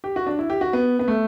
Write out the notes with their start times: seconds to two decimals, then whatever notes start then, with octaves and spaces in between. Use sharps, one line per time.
0.04 G4
0.16 F#4
0.27 D4
0.39 E4
0.50 G4
0.61 F#4
0.73 B3
0.99 B3
1.08 A3